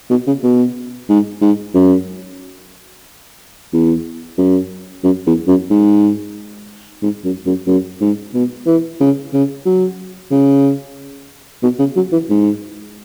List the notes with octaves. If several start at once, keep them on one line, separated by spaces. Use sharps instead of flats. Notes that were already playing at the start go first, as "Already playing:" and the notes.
B2
C#3
B2
G#2
G#2
F#2
E2
F#2
F#2
E2
F#2
G#2
G#2
F#2
F#2
F#2
G#2
B2
E3
C#3
C#3
F#3
C#3
B2
C#3
F#3
E3
G#2